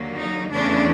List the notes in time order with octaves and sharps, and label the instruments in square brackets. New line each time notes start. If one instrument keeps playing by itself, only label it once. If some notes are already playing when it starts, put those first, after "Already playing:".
Already playing: [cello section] D#2 D3 F#3 A#3
D#4
E2 C#3 E3 A3 C#4 D4